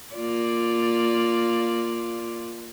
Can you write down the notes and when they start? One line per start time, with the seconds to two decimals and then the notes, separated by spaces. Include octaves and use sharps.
0.15 A#3 F4 D5